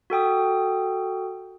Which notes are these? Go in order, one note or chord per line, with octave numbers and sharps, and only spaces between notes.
F#4 A4 G5 D#6